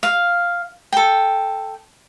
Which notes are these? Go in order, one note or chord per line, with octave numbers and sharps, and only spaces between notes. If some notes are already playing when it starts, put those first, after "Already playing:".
F5
A4 G5